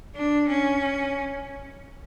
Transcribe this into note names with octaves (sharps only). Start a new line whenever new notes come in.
D4
C#4